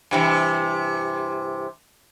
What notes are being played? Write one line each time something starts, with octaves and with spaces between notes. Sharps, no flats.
G2 C3 E3